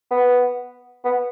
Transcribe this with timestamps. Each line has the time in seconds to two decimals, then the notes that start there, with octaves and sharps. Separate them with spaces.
0.11 B3
1.05 B3